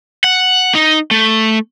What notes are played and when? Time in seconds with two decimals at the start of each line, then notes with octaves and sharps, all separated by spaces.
0.24 F#5
0.75 D#4
1.11 A3